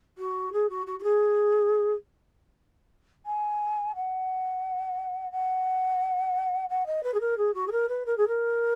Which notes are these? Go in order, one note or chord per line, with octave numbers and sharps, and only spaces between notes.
F#4
G#4
F#4
F#4
F#4
G#4
G#5
F#5
F#5
F#5
D#5
B4
G#4
A#4
G#4
F#4
G#4
A#4
B4
A#4
G#4
A#4